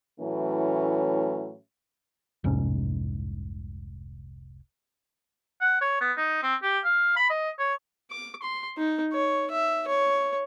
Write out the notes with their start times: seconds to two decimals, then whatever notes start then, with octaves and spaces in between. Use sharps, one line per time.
0.20 A2 E3 F#3 A3 C#4
2.44 F1 C2 G#2 C#4
5.61 F#5
5.81 C#5
6.01 B3
6.17 D#4
6.43 C4
6.63 G4
6.84 F5
7.16 B5
7.30 D#5
7.59 C#5
8.10 D6
8.43 C6
8.77 D#4
9.12 C#5
9.51 E5
9.87 C#5